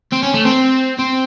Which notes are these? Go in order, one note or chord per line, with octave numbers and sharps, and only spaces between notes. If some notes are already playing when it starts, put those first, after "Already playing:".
C4
C#4
A3
C4
C4